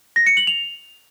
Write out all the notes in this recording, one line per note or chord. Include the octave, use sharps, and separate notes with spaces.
A#6
C#7
F#7
F7